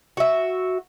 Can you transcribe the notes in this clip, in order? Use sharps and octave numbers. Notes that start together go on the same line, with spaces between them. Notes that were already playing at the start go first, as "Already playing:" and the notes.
F#4 E5